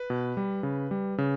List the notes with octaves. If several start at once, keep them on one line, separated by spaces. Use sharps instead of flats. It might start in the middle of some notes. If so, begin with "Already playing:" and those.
Already playing: B4
B2
G3
C#3
G3
C#3